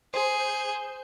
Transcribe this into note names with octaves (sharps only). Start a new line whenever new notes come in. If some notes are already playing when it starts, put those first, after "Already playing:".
G#4 C5